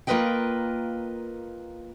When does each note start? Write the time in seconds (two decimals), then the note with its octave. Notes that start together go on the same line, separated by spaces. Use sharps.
0.07 A#3 F4 A#4 B4 D#5 G5